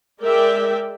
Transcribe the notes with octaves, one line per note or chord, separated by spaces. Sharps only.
G#3 A#4 D5 E5 G5